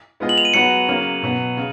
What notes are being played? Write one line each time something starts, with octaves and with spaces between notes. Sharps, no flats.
G#3 B3 F4 G#4 D#5
F#7
F7
D#7
F#3 B3 F#4 B4 C#7
C#3 F#3 A#3 C#4
B2 F#3 B3
C#3